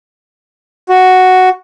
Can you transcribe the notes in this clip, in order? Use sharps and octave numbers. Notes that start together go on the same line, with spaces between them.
F#4